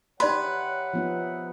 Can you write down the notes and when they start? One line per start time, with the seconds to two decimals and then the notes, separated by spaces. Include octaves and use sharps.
0.20 D#4 G4 B4 C#5 D5 E5 F#5 C6
0.93 F3 B3 D#4